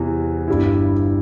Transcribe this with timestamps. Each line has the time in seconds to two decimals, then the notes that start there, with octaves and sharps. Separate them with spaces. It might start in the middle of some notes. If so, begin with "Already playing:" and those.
Already playing: E2 C3 E3
0.48 G1 G2 G3 E4